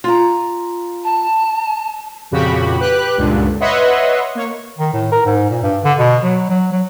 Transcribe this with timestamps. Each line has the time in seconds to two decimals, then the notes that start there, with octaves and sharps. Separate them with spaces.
0.04 F4 A#5
1.04 A5
2.31 F2 A#2 C#3 F#4 G4 B5
2.80 G4 B4 F#6
3.17 C#2 G2 A#2 D3
3.60 B4 C#5 D#5 E5 F#5 C6
4.35 A#3 C#5
4.78 D#3
4.93 A2
5.12 A#4
5.25 G#2
5.50 A#2
5.63 G2
5.84 D3
5.99 B2
6.23 F#3
6.49 F#3
6.72 F#3